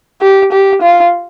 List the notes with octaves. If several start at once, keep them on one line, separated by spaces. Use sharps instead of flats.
G4
G4
F4